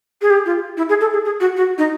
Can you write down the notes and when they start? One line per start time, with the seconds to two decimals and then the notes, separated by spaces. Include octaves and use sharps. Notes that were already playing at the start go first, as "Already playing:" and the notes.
0.22 G#4
0.30 G4
0.46 F4
0.77 E4
0.89 G#4
1.01 A4
1.13 G#4
1.25 G#4
1.40 F#4
1.57 F#4
1.78 D#4